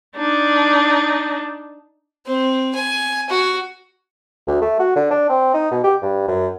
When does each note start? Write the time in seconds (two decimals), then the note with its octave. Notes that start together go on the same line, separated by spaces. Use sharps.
0.17 D4 D#4
2.27 C4
2.75 G#5
3.29 F#4
4.47 D2
4.62 A3
4.79 F#4
4.96 D3
5.11 D4
5.29 C4
5.54 D#4
5.71 B2
5.83 G4
6.02 G2
6.28 F#2